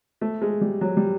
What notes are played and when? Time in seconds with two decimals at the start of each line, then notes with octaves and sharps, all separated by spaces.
0.21 A3
0.42 G#3
0.61 G3
0.81 F#3
0.97 G3